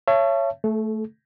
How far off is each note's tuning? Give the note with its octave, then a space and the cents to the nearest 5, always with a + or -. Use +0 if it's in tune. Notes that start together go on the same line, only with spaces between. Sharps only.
C#5 +0 E5 +40 A5 +0
A3 +0 A4 -35